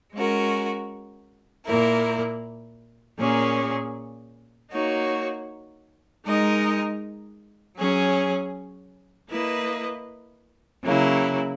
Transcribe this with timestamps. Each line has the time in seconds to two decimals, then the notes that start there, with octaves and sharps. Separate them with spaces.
0.13 G#3 C#4 F#4 A#4
1.66 A#2 A#3 E4 A#4
3.19 A#2 A#3 C#4 G#4
4.72 A#3 D#4 F#4 C#5
6.25 G#3 D#4 A#4 D#5
7.78 F#3 C#4 G#4 C#5
9.31 A#3 E4 B4 D#5
10.84 C#3 F#3 A#3 E4